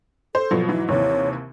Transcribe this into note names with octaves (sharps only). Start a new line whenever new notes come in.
A4 C5
B2 F3 F#3
G#2 E3 F#3 E4
D#2 C3 E3 C#5